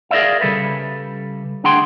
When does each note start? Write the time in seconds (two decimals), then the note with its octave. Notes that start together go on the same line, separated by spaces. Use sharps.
0.11 G#4 A#4 C5 D5 E5 F5
0.41 C#3 G3 A4 B4
1.64 D2 D4 G#4 F#5 G5 C6